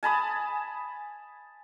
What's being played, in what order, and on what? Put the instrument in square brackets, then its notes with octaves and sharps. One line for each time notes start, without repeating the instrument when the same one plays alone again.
[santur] G#5 A5 B5 D#6